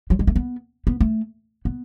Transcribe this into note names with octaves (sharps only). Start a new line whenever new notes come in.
F#3
G#3
A3
B3
B3
A3
B3